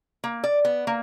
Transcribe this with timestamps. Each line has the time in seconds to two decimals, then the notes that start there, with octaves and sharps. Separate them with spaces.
0.24 A#3
0.44 D5
0.65 B3
0.87 A#3